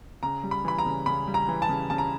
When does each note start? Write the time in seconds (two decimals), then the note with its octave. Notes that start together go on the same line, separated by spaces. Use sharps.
0.23 C#3 A#5
0.43 G3
0.51 B5
0.65 E3 B5
0.78 A#5
0.86 C#3
1.06 C#3 B5
1.27 G3
1.34 A#5
1.49 E3
1.62 A5
1.69 C#3
1.90 C#3 A5
1.98 A#5